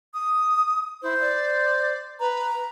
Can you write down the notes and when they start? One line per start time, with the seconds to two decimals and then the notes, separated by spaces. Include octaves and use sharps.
0.14 D#6
1.02 E4 C5
1.21 D5
2.20 B4 A#5